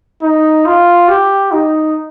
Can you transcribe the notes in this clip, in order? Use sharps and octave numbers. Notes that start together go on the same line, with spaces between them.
D#4
F4
G4
D#4